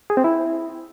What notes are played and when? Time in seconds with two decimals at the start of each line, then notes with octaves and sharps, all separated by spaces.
0.10 G#4
0.17 C4
0.24 E4